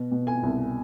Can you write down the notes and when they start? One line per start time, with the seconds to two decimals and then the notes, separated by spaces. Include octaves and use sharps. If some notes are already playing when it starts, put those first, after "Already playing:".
Already playing: B2
0.11 B2
0.27 G#5
0.43 C2